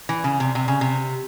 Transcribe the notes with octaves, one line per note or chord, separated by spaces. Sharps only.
E3
C#3
C3
C3
C#3
C3